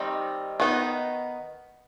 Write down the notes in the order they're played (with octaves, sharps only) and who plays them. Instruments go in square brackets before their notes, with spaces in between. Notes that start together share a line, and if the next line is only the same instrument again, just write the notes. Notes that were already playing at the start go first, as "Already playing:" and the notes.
Already playing: [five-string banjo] D#3 G3 C4 D#4
D#3 B3 D#4